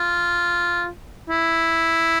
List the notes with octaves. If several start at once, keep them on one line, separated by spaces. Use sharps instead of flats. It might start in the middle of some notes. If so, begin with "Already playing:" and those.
Already playing: F4
E4